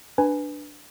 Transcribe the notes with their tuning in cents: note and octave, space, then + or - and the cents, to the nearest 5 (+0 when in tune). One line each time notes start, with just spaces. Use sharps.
D4 +5 B4 +0 G#5 +0